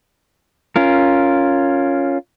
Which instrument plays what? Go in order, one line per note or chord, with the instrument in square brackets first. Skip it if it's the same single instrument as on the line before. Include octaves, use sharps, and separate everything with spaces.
[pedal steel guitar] C#4 F4 A#4